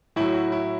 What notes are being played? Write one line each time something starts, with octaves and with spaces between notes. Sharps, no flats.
A2 F#3 E4
F#4
E4